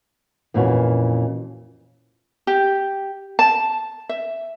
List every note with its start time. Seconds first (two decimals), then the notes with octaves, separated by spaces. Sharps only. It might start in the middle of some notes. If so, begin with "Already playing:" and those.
0.54 F2 A#2 E3 C#4 F#4
2.47 G4
3.39 A5
4.09 E5